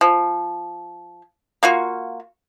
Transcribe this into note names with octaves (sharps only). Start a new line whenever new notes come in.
F3
A#3 F4 F#4